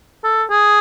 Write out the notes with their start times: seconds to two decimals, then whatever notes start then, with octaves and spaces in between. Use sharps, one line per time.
0.24 A4
0.51 G#4